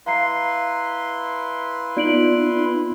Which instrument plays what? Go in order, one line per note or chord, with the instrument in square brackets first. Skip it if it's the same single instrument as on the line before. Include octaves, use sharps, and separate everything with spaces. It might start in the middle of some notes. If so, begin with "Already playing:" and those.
[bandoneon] E4 B4 C6 [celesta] F5 A#5 C7
[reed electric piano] B3 D#4 F4 [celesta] D5 D7 F#7